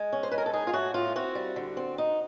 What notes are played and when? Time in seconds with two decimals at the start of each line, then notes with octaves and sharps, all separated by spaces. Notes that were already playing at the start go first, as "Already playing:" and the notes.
Already playing: G#3
0.13 C#4
0.23 C5
0.31 G#3 B4
0.38 A#4
0.46 A4
0.53 D#4 G#4
0.67 F4
0.73 A2 F#4
0.94 A2 F4
1.16 C4 F#4
1.35 G3
1.56 D3
1.77 C4
1.98 D#4